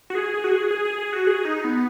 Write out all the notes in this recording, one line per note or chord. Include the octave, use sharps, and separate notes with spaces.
F#4
G#4
G#4
F#4
G#4
G#4
G#4
G#4
F#4
G#4
D#4
B3